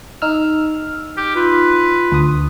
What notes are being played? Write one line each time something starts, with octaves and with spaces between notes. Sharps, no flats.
D#4 E6 F6
G4
F4 B4
D2 D#6